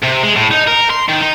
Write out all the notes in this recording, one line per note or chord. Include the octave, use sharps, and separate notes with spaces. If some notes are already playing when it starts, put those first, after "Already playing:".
C3
G#3
A2
D#4
A#4
C6
D#3
D#4